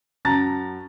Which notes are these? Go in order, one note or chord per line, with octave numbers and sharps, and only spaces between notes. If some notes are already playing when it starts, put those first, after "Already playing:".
F#2 A5 A#5 A6